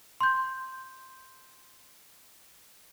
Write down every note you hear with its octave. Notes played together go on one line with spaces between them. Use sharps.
C6 G6